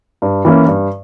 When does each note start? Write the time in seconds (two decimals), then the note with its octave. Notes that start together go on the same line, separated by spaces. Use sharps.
0.22 G2
0.45 E3 A#3 C#4
0.67 G2